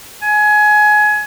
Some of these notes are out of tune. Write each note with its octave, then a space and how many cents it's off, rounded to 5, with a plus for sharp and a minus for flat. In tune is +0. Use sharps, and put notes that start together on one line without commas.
G#5 +25